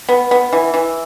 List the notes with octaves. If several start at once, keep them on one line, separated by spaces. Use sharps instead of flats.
B3
B3
E3
E3